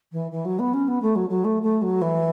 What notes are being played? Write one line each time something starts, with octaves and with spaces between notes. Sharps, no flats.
E3
E3
F#3
B3
C#4
B3
A3
F#3
F#3
A3
A3
F#3
E3